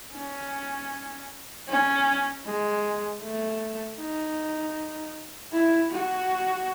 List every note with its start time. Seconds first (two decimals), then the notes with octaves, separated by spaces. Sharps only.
0.13 C#4
1.68 C#4
2.45 G#3
3.23 A3
3.99 D#4
5.52 E4
5.91 F#4